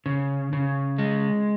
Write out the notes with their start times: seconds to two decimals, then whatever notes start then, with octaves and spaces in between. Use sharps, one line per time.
0.06 C#3
0.53 C#3
0.98 G#3